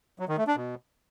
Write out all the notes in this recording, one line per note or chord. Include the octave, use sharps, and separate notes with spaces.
F#3
D#3
A3
D4
B2